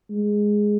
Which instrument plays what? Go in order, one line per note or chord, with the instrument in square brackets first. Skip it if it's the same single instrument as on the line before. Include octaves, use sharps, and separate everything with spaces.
[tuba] G#3